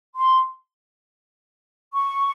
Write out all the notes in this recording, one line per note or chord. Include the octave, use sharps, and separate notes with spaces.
C6
C#6